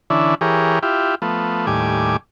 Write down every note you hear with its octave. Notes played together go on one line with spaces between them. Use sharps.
D3 E3 C#4 D4 E4
E3 G4 G#4 A#4 C#5
E4 F4 G4
F3 A3 B3
D#2 A2 G3 G#5 D6